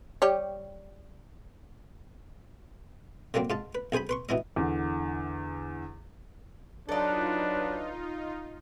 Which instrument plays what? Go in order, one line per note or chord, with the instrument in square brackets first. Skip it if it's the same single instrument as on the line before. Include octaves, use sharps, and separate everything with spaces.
[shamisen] G3 G4 C#5
[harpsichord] D3 F#3 G3 A#3 C4
G#2 F4 A5
B4
B1 G#4 C5 G#5 B5
B4 C6 C#6
B2 E3 E4 D#5
[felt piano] E2 D3
[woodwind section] F#3 B4 [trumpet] D4 [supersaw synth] D#4 F4 [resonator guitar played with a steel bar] A4 D5